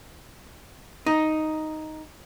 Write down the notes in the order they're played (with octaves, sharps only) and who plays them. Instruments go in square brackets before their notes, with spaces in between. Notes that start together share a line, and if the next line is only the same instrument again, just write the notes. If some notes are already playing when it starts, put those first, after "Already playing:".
[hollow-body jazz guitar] D#4